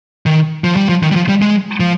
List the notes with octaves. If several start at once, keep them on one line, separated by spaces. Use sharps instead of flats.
D#3
F3
G3
F3
D#3
G3
F3
G3
G#3
F3